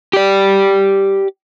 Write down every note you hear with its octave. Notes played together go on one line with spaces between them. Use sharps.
G4 D5